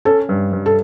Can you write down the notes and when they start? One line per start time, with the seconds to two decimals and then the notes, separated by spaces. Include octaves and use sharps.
0.05 C#4 A4
0.29 G2
0.53 G2
0.66 A4